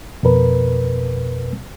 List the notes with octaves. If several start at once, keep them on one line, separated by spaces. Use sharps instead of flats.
F2 B2 A#4 B4